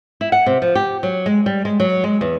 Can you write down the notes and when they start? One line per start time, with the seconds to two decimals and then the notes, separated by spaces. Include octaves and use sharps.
0.21 E4
0.32 F#5
0.46 C3
0.62 F3
0.75 G4
1.03 F#3
1.26 G#3
1.46 G3
1.65 G#3
1.80 F#3
2.04 G#3
2.21 E2